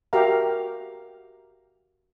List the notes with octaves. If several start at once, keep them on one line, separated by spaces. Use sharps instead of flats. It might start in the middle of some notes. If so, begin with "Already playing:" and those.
F#4 G4 A#4 E5 F5 A#5